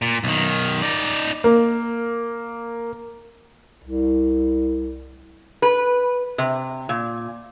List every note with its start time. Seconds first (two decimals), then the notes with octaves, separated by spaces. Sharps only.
0.02 A#2
0.24 B1 D#3
0.82 D#4 D5
1.44 A#3
3.84 C2
5.62 B4
6.38 C3
6.89 A#2